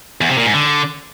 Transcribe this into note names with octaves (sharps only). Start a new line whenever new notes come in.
E2
C3
A#2
G#2
D3